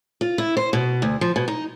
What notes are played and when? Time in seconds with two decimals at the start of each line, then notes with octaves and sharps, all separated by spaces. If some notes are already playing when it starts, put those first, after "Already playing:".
0.21 F4
0.38 E4
0.57 C5
0.73 B2
1.02 D2
1.21 F3
1.36 B2
1.48 D#4